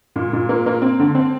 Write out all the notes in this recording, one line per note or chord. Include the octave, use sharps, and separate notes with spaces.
A#2
A#2
A#3
A#3
C4
D3
C4